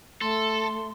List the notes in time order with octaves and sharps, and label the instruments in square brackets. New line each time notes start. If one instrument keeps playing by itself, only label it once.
[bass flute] A3 [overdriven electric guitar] A4 [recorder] C6